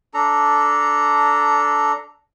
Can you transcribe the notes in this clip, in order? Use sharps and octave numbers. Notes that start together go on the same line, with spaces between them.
D4 A4 A#5